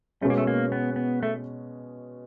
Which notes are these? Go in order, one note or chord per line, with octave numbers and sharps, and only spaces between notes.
B2 G#3 A3 C#4
A#3
A3
A#3
B3
B3
A3